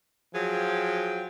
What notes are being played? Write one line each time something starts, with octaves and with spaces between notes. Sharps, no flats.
F3 F#3 G#4 G5